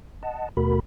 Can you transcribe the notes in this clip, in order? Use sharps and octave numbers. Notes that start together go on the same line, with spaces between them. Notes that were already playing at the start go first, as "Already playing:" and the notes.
D#5 F#5 A5
D#2 B2 A3 F#4 A#4 B5